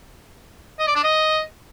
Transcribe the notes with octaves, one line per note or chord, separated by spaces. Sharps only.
D#5
D5
D4
D#5